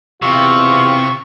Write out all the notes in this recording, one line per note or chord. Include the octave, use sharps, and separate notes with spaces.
E2 C3 F4 G4 C#6